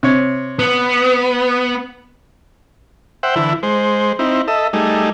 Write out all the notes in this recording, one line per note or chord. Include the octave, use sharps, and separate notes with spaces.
C3 C#5
B3
C5 E5 F#5 G5
D3 E3 E4
G#3 C5
C4 D#4 E4
A4 D#5 E5
G3 A3 D#4 G#4